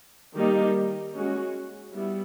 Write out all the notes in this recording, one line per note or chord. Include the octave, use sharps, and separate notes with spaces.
D#3 G3 A#3 D#4 G4
G#3 C#4 F#4
G3 B3 E4